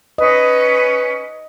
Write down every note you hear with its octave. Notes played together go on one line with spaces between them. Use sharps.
C#4 B4 D#5